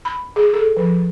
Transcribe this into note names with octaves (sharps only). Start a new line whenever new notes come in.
B5
G#4
A4
F3